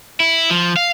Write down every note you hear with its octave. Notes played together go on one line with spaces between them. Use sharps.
E4
F3
F5